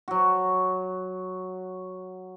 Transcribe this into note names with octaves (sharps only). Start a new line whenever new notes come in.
F#3 F#4